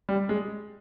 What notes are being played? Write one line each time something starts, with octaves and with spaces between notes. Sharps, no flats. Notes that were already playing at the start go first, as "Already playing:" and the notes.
G3
G#3